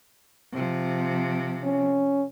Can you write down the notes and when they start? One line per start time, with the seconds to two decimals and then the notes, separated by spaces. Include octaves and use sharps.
0.53 C3 F3
1.63 C#4